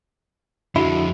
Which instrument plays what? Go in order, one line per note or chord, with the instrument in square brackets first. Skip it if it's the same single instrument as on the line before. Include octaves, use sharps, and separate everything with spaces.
[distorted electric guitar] F2 G#3 [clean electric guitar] D3 E4 [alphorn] F#4